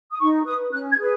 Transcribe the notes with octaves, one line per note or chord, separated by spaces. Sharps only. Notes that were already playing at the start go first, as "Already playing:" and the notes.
D#6
D#4 C#6
B4 D#6
C#4 F#6
G#6
G#4 B4